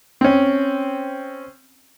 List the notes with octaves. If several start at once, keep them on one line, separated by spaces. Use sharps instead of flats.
C4 C#4